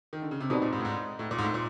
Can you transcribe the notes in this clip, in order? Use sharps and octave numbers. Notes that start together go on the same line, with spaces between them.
D#3
D3
C#3
C3
B2 C4 D#4 G4 B4 D5
A#2
G#2
A2
G#2
A2
A#2
G#2
A2
A#2